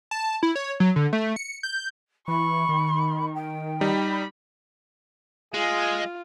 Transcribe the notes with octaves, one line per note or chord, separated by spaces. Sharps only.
A5
E4
C#5
F#3
D3
A3
C#7
G6
E3 B5 C#6
D#3
G5
G3 D#4 B5
G#3 F4 G#4